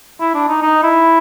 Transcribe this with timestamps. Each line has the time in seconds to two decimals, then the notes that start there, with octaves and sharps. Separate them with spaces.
0.20 E4
0.34 D4
0.48 D#4
0.62 D#4
0.83 E4